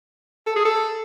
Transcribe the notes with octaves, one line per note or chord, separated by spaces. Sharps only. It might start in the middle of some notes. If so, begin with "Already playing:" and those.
A4
G#4
A4